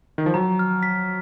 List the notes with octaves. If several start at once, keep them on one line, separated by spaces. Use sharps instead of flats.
D#3
F3
F#3 A#5
F6
B6